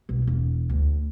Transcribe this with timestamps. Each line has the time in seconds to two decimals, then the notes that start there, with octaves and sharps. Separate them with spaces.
0.09 B1
0.27 E1
0.70 D2